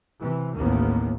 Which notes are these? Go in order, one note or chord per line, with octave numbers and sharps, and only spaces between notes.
C3 E3
A1 D#2 A2 A#3 B3